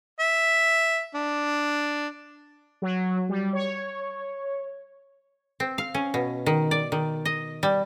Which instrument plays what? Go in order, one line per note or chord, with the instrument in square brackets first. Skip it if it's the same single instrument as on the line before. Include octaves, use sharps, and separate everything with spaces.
[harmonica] E5
D4
[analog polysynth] F#3
G3
C#5
[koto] C4
F5
C#4
B2
D#3
D5
D#3
D#5
G3